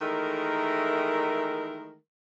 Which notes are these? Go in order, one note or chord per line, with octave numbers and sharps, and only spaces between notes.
D#3 E3 G#3 A3 A#4